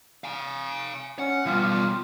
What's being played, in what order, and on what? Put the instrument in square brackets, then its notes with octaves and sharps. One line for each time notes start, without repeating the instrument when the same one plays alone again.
[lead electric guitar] F5 G#5
[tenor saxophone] C#4 [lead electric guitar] F#5
[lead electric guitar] B2 G3 [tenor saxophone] F4